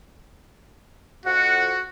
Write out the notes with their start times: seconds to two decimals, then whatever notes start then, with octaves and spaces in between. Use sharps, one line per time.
1.26 F2 F#4 F#5